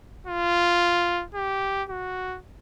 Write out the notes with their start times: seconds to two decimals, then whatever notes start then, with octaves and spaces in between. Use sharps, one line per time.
0.27 F4
1.35 G4
1.89 F#4